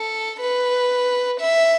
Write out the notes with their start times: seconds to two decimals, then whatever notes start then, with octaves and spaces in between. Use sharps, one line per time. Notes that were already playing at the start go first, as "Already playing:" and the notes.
Already playing: A4
0.40 B4
1.40 E5